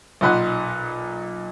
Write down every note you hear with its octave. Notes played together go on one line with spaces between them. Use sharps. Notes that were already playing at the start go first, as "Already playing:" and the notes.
B1 A#2 D#4 F#5 B5 C6